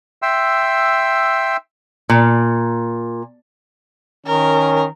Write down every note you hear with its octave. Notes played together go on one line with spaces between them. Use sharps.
E5 G5 C6 E6
A#2
D#3 C#4 A#4